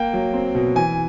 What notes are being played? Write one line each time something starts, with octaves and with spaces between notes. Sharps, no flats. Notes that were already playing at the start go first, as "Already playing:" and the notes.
Already playing: A#3 G5
F#3
C4
B2
E3 G#5